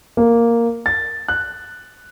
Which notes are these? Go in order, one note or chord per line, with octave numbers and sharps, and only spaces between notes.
A#3
A6
F#6